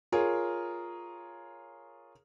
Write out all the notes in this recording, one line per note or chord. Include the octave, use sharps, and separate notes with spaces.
F4 G#4 A#4 C#5